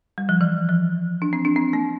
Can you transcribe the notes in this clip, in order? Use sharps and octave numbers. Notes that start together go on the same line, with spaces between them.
G3
F3
E3
F3
D4
C4
D4
C4
A#3